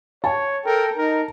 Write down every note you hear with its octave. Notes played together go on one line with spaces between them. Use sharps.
C#5 A5
A4 A#4 G5
D#4 A#4